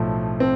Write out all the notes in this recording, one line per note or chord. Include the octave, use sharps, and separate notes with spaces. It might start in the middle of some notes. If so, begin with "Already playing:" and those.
Already playing: B1 A2 F3 A3
C4